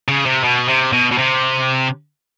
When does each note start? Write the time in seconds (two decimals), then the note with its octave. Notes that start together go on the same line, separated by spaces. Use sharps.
0.08 C#3
0.26 C3
0.44 B2
0.69 C3
0.93 B2
1.12 B2
1.18 C3